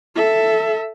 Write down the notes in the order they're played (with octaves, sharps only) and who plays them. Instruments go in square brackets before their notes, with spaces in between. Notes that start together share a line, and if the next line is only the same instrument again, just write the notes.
[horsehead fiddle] A4 E5